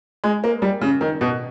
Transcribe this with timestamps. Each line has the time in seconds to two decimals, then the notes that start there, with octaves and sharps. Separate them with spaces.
0.24 G#3
0.44 A#3
0.62 G3
0.81 C#3
1.01 D#3
1.21 B2